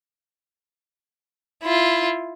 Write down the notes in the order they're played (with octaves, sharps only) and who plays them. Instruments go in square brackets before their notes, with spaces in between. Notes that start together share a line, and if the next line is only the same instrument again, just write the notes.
[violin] E4 F4